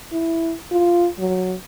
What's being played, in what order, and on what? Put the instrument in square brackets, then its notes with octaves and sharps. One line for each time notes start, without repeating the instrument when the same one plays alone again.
[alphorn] E4
F4
F#3